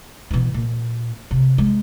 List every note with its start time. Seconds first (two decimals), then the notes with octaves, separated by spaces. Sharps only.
0.31 B2 E3
0.54 A#2
1.31 C3
1.58 G#3